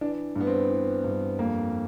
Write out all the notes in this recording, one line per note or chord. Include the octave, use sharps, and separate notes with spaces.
E3 D4
G2 B3
C4
E3
G2
F2 A#3